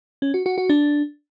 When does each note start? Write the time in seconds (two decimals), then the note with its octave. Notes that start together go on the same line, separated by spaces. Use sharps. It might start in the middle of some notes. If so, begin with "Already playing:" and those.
0.22 C#4
0.34 F#4
0.46 F#4
0.58 F#4
0.69 D4